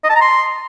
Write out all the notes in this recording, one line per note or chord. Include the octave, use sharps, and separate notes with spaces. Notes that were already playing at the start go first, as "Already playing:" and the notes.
D#5
A5
A#5
C6